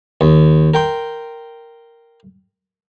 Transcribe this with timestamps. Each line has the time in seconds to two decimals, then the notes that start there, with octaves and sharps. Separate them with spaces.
0.21 D#2
0.74 A#4 G5 C6